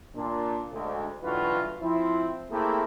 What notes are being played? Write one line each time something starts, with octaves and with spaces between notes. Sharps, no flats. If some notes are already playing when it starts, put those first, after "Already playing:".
A#2 D4
D2 G#2 D3
B1 G2 E3 F4 F#4 B4
F3 C4 E4
A3 A#3 C4 E4 G4 G#4